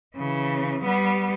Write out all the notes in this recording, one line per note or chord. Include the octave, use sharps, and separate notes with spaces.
C#3 E3
G3 B3